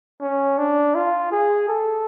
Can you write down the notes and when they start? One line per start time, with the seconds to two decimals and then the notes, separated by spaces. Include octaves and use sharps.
0.21 C#4
0.58 D4
0.95 F4
1.32 G#4
1.69 A4